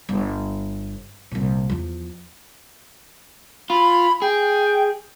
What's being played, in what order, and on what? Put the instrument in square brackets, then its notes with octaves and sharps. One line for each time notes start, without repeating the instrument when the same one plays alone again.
[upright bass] G1
C2 A#2
E2 F3
[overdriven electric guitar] F4 [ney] B5
[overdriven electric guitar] G#4 [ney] G5